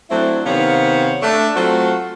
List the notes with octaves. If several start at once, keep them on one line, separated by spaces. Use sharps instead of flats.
F#3 A3 C4 D4 E4
C3 D#3 B3 C5 C#5 F5
A3 D4
F#3 A3 C4 F4 F#4